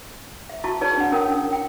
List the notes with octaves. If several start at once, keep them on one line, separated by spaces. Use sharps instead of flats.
E5
E4 F#4 E5 A5 C#6
D#4 G#4 B4 C#5 D5 A5
D4 F#5
C#4 E4 A#4 G5 D#6
G5